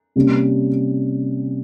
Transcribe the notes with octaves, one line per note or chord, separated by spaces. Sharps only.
C3 G3 A#3 C#4